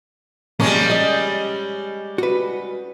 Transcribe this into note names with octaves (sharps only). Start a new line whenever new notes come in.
A#2 F3 G3 G#3 A#3 C#4
G#4 D5 D#5
F#4 B4